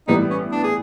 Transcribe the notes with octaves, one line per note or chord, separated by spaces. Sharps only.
A2 E3 G3 B3 D#4
C#4
D4
G#4